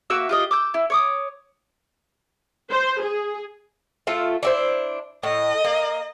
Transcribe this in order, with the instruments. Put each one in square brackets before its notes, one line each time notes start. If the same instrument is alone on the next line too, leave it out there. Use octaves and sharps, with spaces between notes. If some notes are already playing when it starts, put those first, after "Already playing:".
[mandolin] A#3 F#4 E5 E6
F4 G4 D#5
D6 E6 G6
E4
C#5 D6 D#6
[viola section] C5
G#4
[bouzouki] A3 F4 E5
D4 E4 C5
[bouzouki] A2 [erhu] D#5
[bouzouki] A#3